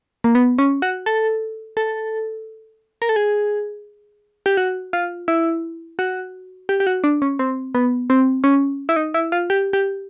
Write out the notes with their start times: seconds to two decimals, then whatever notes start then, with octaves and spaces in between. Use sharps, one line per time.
0.24 A#3
0.35 B3
0.59 C#4
0.82 F#4
1.06 A4
1.77 A4
3.02 A#4
3.09 A4
3.16 G#4
4.46 G4
4.57 F#4
4.93 F4
5.28 E4
5.99 F#4
6.69 G4
6.80 G4
6.87 F#4
7.04 D4
7.22 C#4
7.39 C4
7.75 B3
8.10 C4
8.44 C#4
8.89 E4
8.96 D#4
9.14 E4
9.32 F4
9.50 G4
9.73 G4